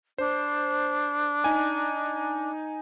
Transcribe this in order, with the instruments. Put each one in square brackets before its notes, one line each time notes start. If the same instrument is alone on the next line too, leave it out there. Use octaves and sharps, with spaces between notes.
[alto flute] D4 [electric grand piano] C5
[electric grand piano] D#4 G#5